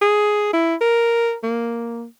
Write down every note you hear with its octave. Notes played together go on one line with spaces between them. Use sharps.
G#4
E4
A#4
A#3